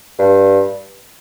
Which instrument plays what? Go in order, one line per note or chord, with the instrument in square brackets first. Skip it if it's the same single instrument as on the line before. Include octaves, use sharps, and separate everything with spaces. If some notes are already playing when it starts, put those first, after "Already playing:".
[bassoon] G2